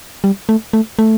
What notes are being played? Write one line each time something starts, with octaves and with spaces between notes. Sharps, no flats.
G3
A3
A3
A3